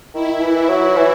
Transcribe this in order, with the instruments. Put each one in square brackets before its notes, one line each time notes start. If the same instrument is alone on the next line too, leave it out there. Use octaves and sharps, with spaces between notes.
[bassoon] D#3 [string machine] E4
[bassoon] E3
[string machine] E4
[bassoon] F#3
E3